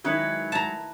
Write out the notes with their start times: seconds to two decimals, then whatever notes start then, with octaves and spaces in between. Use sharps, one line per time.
0.04 D#3 F#3 G#3 E4 B4 C#5 D#6
0.52 A5 A#5